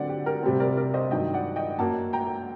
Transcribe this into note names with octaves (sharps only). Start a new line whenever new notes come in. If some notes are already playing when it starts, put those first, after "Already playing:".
Already playing: D3 F#3 C4 D5 F#5
G4
G4 A#4
C3 G3 C4
A#4 D5
A#4 D5
C5 D#5
G2 D#3 F#3 D#5 G5
D5 F#5
D#5 G5
F#2 F#3 A#3 F#5 A5
G5 A#5